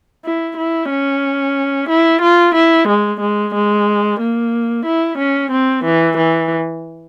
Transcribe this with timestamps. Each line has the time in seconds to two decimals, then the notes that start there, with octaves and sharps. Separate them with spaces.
0.25 E4
0.57 E4
0.90 C#4
1.89 E4
2.22 F4
2.55 E4
2.88 G#3
3.21 G#3
3.55 G#3
4.20 A#3
4.86 E4
5.19 C#4
5.52 C4
5.85 E3
6.17 E3